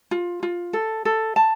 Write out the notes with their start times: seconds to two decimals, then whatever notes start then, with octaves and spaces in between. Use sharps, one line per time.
0.11 F4
0.43 F4
0.73 A4
1.05 A4
1.36 A5